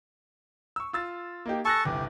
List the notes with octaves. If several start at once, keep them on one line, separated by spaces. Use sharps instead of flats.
C#6 E6
F4 E6 A6
A#3 D#4 G4
A4 G#5 A5 C#6 F#6 A#6
G1 C2 G4